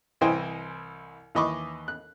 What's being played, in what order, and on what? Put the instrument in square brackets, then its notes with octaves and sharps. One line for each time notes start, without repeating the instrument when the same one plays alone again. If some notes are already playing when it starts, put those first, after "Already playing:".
[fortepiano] C2 E3 C5 D#5 G5 G#5
D#2 E3 D#5 B5 C#6 D6
F#6